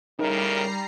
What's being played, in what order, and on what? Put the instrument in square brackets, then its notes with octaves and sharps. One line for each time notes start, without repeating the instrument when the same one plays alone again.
[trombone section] G#1 A2 A#4 [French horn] C#3 [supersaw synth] G3 A#5 C7 [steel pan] D#4